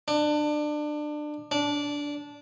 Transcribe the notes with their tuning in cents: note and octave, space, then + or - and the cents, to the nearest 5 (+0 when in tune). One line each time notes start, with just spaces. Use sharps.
D4 +25
D4 -15